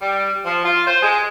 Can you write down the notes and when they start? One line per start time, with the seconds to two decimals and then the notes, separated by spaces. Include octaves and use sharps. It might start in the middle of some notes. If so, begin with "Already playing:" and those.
0.01 G3
0.44 F3
0.64 F4
0.87 C5
1.02 G#3